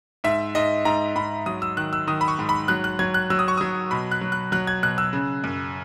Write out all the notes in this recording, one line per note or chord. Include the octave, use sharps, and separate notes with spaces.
G#2 E5
G#2 D#5
G#2 A#5
G#2 B5
F#3 D#6
E6
D#3 F#6
E6
D#3 D#6
B5
C#6
G#2
B5
F#3 F#6
F#6
F#3 G#6
F#6
F#3 E6
D#6
C#6
F#3 D#6
B2 B5
F#6
F#3
F#6
F#3 F#6
G#6
B2 F#6
E6
C#3
F#2